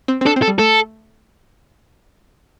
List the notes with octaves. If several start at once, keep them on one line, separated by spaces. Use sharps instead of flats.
C4
C4
D4 A4
C4
A4
G3
A3 A4